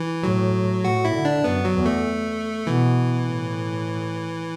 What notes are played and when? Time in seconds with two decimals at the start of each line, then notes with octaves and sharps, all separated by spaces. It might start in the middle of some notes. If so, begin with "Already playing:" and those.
Already playing: E3
0.23 A2 F#3
0.84 A2 F#4
1.05 E4
1.14 D3
1.25 D4
1.44 F#2 B3
1.65 F#3
1.75 E2
1.86 A3
2.66 B2 E3
3.27 A2